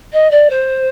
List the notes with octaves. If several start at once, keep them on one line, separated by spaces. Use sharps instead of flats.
D#5
D5
C5